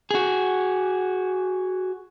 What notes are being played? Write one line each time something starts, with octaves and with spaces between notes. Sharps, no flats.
F#4 G#4